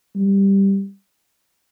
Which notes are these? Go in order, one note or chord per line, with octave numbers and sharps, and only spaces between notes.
G3